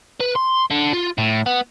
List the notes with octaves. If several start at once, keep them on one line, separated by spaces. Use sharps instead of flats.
B4
C6
D3
F4
A2
B3